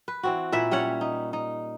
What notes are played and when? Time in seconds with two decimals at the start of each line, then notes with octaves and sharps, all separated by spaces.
0.08 B4
0.23 E3 C4 F#4
0.52 A#2 E4 E5 F#5
0.71 G3 C#4 C#5 F#5
1.01 D#4
1.33 D#4